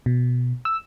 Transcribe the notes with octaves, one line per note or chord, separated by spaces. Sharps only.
B2
E6